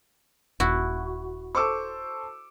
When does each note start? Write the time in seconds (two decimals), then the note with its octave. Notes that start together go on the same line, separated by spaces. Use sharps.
0.60 D#1 E4 F#4
1.55 A4 C5 C#6 D6 E6